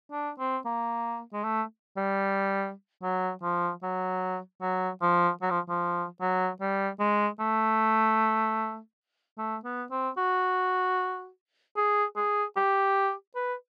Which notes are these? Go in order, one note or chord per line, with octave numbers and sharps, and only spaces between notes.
D4
C4
A#3
G#3
A3
G3
F#3
F3
F#3
F#3
F3
F#3
F3
F3
F#3
G3
G#3
A3
A3
B3
C4
F#4
G#4
G#4
G4
B4